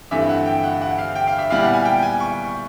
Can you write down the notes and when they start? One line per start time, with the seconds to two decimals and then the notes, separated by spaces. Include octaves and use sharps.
0.11 G2 E3 A3 C4 E5
0.29 F#5
0.46 G5
0.64 F#5
0.82 F#5
0.98 F5
1.16 G5
1.27 F5
1.39 E5
1.50 A#2 G3 B3 E4 F5
1.62 F#5
1.74 G#5
1.85 G5
2.03 G#5
2.20 C#6